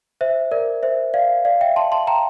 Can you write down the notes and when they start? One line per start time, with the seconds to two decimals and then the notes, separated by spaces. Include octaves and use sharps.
0.21 C5 E5
0.51 A#4 D5
0.83 C5 E5
1.14 D5 F5
1.45 D5 F5
1.61 E5 G5
1.76 A5 C6
1.92 A5 C6
2.07 G5 A#5